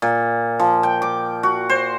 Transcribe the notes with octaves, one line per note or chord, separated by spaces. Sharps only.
A#2
F3
G5
D6
F#4
C5